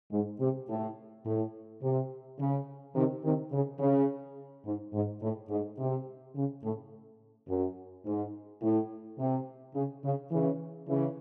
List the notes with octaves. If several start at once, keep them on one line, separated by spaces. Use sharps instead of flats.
G#2
C3
A2
A2
C3
C#3
C3 D#3
C3 D#3
C#3
C#3
G#2
G#2
A2
G#2
C3
C#3
A2
F#2
G#2
A2
C3
C#3
C#3
C#3 E3
C#3 E3